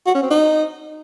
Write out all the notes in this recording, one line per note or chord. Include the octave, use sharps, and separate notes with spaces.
F#4
C#4
C4
D#4